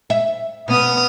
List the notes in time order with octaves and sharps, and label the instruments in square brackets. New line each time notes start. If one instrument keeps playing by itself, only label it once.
[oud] E5
[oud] B2 [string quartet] B3 D#6 F6